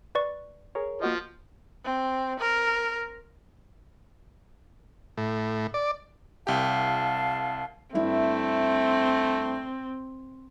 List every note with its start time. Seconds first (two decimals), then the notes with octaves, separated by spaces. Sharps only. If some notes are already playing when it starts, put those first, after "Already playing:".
0.15 B4 D5 C#6
0.75 G#4 A#4 C#5
1.02 F3 A#3 F#4 D#5
1.85 C4
2.40 A#4
5.17 A2
5.74 D5
6.47 C2 G4 F5 A5
7.94 G2 A3 C4 E4